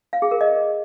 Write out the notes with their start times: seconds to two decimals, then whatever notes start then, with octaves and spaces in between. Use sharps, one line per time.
0.13 F5
0.22 G#4
0.31 A#4
0.41 D#5